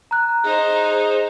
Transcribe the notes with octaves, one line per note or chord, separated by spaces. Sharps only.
A#5 F#6
D#4 G#4 C5